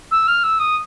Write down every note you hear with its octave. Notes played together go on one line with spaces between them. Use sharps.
E6
F6
E6
D#6